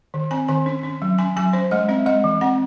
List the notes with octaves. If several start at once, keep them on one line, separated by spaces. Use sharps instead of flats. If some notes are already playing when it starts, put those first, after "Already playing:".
D#3
C4 G#5
D#3 G#5
C#4
C#4
F#3
C#4 G#5
F#3 G#5
C#4 C5
G#3 D#5
C4 E5
G#3 D#5
E3
C4 F#5